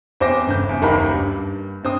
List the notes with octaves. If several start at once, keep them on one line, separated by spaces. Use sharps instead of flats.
E2 C4 C5 D6 A#6
G1 C#3 G6
E2
F#1 D#2 A#3 D#4 G4 B5
G2
G2 C4 D#6